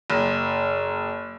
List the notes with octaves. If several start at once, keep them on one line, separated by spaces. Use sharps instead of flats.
F#1